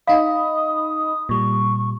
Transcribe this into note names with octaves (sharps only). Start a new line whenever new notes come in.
D#4 D#5 F5 B5 D#6
A#2 G3 C#6